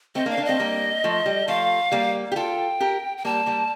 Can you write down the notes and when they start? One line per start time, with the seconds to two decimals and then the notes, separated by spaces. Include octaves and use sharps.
0.15 A3 C4 D#5
0.26 A#3 D4
0.30 F5
0.37 A#3 D4
0.45 A3 C4 D#5
0.60 G3 A#3
1.04 F3 A3
1.26 G3
1.48 F3 A3 F5
1.92 G3 A#3
2.32 G4
2.36 F4 A4 G5
2.80 G4 A#4
3.17 G5
3.25 G3 A#3 A5
3.46 G3 A#3